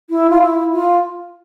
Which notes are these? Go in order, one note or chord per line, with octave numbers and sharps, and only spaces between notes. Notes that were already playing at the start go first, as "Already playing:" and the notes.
E4
F4
E4
F4